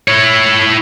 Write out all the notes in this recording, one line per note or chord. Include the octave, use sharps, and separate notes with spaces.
E4 C#5